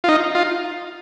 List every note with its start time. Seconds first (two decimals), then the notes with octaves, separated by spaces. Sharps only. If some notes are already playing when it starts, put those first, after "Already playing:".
0.04 F4
0.09 D#4
0.35 F4